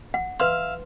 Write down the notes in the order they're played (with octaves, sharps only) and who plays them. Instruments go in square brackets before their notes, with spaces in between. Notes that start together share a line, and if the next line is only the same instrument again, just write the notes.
[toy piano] F#5
[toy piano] B4 C6 [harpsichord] E5 F5